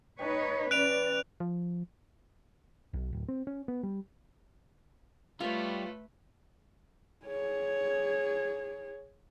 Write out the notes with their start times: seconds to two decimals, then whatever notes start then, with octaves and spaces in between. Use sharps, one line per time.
0.19 D#4 G4 B4 C#5 A5
0.71 E3 C#4 D5 F#6 D7 F7
1.40 F3
2.93 B1
3.13 D1
3.28 C4
3.47 C#4
3.68 B3
3.83 G3
5.40 G3 A3 F4 B4 C#5
7.26 G#4 C#5